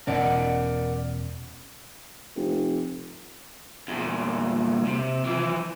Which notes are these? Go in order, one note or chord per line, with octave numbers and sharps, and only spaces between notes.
E1 B2 C#4 A#4 D5 F#5
F1
E2 A#2
C3
E3 F3